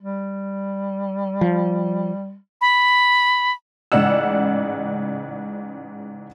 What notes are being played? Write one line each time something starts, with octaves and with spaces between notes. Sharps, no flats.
G3
F3
B5
A1 G#2 C#3 D5 F#5 E6